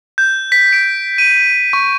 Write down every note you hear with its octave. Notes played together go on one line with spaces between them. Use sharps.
G6
B6
D7
D#7
C#6